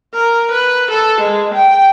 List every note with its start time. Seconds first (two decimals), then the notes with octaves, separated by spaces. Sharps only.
0.14 A#4
0.51 B4
0.91 A4
1.20 G#3
1.54 G5